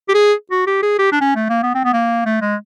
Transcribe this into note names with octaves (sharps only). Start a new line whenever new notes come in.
G4
G#4
F#4
G4
G#4
G4
D4
C#4
A3
A#3
B3
C4
B3
A#3
A3
G#3